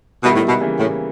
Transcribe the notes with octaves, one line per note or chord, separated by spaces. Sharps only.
B2 D#3 G3 B3 E4
A2
B2
C#3 E3 G3 A#3
A2